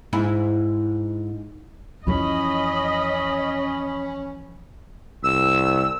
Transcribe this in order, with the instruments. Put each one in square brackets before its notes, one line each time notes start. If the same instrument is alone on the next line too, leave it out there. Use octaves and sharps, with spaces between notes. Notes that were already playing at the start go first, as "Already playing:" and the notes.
[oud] G#2 E4
[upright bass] F2 E3 [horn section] C#4 [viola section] D#5 [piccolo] B5
[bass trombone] C2 [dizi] E6